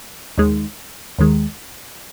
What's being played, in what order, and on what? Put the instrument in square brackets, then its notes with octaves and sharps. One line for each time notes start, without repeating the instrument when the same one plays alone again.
[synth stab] D#2 D#3 G#3
D#2 D#3 G#3